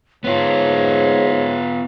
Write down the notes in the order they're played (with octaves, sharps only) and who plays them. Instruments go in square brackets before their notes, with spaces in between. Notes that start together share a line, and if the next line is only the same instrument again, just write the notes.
[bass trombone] G#2 [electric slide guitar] B3 F4 [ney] C#5